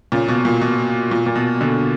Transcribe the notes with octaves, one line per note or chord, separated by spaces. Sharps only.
A#2 C#3
B2
A#2
B2
A#2
A#2
B2
B2 D3